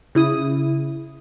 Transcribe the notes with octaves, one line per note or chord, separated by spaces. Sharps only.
C#3 E4 D#6